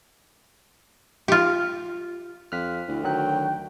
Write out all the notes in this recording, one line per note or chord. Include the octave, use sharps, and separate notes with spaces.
F4 G4
F2 F6 F#6 B6
D2 E4
D#3 F#3 G5 F#6